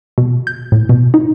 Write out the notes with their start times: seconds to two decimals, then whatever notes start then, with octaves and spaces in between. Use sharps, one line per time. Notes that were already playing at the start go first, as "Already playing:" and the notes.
0.18 B2
0.47 G6
0.72 A2
0.89 B2
1.14 D#4